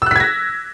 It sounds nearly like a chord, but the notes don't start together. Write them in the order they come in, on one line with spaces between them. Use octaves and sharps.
E6 F#6 B6 G#6 A#6